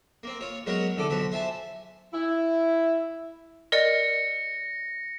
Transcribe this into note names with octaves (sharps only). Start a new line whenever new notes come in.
A#3 C4
F4 C#5
F#3 G#3 B3 A#4 B4 C#5
C2 D3 A4 D6
B1 F3 F#4 B5
C5 E5 G#5 A5
E4
A#4 D5 D#5 A#6 C#7